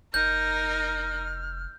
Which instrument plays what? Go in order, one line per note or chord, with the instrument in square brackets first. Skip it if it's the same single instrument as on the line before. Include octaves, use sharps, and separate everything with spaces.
[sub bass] F1 [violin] D#4 A#4 [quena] F6 [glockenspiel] G6